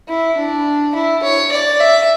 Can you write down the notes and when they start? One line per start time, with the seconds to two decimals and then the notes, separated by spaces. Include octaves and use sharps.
0.08 E4
0.38 D4
0.95 E4
1.23 C#5
1.52 D5
1.80 E5